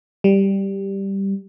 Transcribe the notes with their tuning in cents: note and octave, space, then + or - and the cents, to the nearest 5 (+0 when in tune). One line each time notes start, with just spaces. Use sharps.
G3 +0